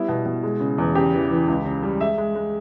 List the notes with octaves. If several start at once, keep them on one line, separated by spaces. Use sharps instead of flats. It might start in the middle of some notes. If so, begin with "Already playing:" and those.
Already playing: G3 B3 E4
B2
B2
G#3
C#3
E2
C#3 G4
E3
E3
C#2
C#3
G3
G#3 E5
G#3
G#3